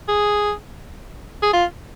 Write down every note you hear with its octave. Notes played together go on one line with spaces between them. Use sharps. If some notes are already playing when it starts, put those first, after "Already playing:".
G#4
G#4
F4